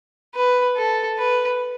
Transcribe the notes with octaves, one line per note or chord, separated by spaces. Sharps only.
B4
A4
B4